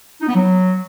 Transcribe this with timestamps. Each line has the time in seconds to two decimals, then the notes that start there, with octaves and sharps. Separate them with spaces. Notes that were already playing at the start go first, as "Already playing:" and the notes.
0.21 D#4
0.27 B3
0.34 F#3